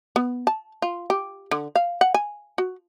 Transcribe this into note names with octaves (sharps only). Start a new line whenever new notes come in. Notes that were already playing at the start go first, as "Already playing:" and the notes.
B3
A5
F4
G4
D3
F5
F#5
G#5
F#4